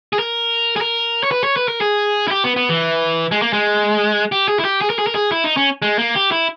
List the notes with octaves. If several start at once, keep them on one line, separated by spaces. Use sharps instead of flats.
G#4
A#4
G#4
A#4
C#5
B4
C#5
B4
A#4
G#4
E4
G4
B3
B3
E3
G#3
A#3
G#3
G4
G#4
E4
G4
G#4
A#4
G#4
A#4
G#4
E4
D#4
C#4
G#3
A#3
G4
E4